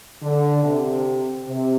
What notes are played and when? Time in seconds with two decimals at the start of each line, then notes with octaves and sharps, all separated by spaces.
0.22 D3
0.64 C3
1.48 C3